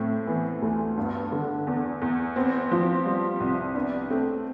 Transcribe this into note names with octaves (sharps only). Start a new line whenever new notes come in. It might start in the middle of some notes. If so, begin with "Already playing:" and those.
Already playing: A2 A3 C4
E3 B3
D2 A3
G2 B3
D3
E2
E2
B3 C4
F3
G3
C2
B3 D4
A3 C4